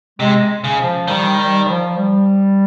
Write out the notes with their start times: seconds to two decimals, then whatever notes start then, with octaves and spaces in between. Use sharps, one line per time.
0.20 C3 G#3
0.64 C#3
0.79 F3
1.08 D#3 G3
1.38 G3
1.67 F3
1.96 G3